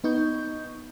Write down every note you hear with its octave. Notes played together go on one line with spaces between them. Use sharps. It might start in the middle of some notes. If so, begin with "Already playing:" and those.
B3 D#4 C#6 G6